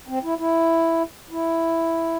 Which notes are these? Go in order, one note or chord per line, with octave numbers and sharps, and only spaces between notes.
C4
E4
E4
E4